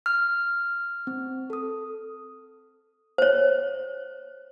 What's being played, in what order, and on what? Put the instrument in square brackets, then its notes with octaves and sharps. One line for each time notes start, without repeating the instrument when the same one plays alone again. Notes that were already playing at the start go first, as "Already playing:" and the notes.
[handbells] F6
[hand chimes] C4
A4 D#6
[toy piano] C5 C#5